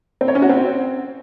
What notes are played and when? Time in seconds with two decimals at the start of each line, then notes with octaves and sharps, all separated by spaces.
0.21 C4
0.28 C#5
0.35 C#4
0.42 F#4
0.49 C4